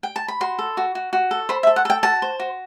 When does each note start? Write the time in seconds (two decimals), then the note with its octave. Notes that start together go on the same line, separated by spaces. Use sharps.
0.03 G5
0.16 A5
0.28 B5
0.41 F#4 C6
0.59 A4
0.77 F#4
0.95 F#4
1.13 F#4
1.31 A4
1.49 C5 B5
1.63 E5
1.67 A4
1.76 F#5
1.85 A4 G5
2.03 F#4 A5
2.22 C5
2.40 F#4